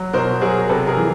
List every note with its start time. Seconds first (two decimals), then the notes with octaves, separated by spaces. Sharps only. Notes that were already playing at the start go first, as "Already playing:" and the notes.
Already playing: F#3
0.13 B2 A#4 C5
0.41 F#3 G#4 A#4
0.69 C3 A4 B4
0.87 G#4 A#4
0.97 E3